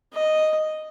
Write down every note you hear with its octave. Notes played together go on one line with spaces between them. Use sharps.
D#5